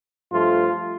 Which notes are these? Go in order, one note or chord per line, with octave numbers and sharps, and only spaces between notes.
G2 F3 A3 F4